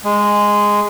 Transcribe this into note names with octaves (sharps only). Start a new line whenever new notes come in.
G#3